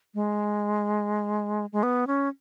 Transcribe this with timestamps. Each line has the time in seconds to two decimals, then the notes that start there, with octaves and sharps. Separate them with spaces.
0.15 G#3
1.73 G#3
1.83 B3
2.07 C#4